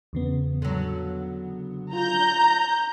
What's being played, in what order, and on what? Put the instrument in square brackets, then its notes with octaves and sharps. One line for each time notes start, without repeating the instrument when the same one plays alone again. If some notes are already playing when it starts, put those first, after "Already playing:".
[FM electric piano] E2 C#3 B3
[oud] D3 F#3
[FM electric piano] F4 [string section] A#5 G6